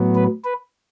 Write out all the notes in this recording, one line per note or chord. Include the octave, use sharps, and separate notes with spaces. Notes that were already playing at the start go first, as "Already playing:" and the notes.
Already playing: A2 F#3 B3
B4
B4